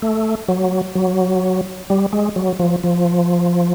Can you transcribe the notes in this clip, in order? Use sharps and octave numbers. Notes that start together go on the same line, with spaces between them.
A3
F#3
F#3
G3
G#3
F#3
F3
F3